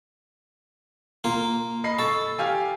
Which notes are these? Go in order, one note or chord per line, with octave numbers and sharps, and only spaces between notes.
A#3 F4
D#5 B5 C7
A4 C#6 A6
G4 F5 G#5